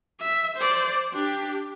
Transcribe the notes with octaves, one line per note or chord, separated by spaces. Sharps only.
E5
C5 D5
D4 G4